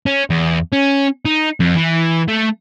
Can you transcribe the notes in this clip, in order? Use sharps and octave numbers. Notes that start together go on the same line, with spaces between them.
C#4
E2
C#4
D#4
F2
E3
A3